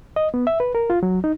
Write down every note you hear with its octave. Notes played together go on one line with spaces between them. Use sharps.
D#5
B3
E5
B4
A#4
F4
F#3
D#4